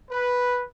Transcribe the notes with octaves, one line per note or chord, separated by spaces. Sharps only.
B4